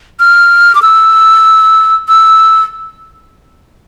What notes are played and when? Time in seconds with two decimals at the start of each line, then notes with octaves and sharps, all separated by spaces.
0.20 F6
0.75 D6
0.82 E6
2.08 E6